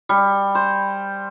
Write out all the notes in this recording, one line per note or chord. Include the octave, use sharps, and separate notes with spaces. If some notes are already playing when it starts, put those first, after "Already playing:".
G3
C5